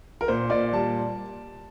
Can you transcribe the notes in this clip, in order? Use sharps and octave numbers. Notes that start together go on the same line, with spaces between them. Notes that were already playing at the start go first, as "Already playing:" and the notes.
A#4
A#2 C5
A#2 D5
G3 A5